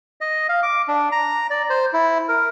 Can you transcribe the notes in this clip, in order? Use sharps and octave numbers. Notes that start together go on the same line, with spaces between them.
D#5
F5
D6
D4
A#5
D5
C5
E4
A#4